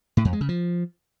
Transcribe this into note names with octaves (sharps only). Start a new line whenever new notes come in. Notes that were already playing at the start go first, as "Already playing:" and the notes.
A2
F2
G#3
C#3
F3